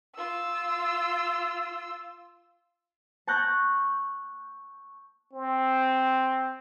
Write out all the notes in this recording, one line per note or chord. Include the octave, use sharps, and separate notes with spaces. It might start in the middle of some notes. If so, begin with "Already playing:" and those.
F4 E6
A5 C#6 F#6 G6 A#6
C4